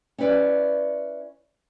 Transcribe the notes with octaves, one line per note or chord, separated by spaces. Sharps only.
C#4 E4 B4 D5